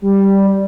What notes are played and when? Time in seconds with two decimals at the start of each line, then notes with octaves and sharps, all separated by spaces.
0.02 G3